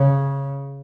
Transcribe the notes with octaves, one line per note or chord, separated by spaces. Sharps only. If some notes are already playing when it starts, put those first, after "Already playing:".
Already playing: C#3